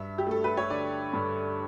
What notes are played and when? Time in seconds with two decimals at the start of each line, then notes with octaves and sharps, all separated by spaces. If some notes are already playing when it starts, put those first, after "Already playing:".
Already playing: G2 E5
0.18 G4
0.27 A3 A4
0.44 B4
0.57 C#5
0.70 D3 D5
1.13 G2